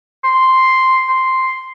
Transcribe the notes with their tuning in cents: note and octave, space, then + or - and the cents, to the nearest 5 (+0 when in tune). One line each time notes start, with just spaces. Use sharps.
C6 +0
C6 +0